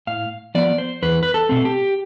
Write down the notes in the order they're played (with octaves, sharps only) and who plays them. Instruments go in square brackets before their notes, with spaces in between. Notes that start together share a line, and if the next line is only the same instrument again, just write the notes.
[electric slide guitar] A2 F5
F3 B3 D5
C5
E2 B4
B4
A4
B2 A3 C4
G4